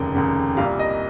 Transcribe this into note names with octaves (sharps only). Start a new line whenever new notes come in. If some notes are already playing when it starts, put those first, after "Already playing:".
Already playing: F1 D#2 C#3 G5
F1 D#2 C#3
C2 A#2 G3 F5
D#5